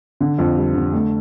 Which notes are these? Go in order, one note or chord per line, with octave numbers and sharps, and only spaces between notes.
D3
F2
G3
D3
A3